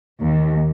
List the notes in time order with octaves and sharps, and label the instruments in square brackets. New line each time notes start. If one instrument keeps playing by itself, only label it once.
[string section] D#2